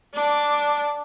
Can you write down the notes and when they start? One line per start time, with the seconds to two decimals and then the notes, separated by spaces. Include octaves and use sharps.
0.14 D4 D6